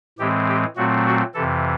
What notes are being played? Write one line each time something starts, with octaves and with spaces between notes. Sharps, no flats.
A2 E3 G#3 C4 G4
G4
A#2 F#3 A3 C4 F#4
F#4
F2 C3 E3 A4